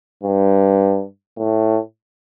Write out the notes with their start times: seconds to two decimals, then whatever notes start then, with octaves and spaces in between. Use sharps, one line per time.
0.24 G2
1.38 A2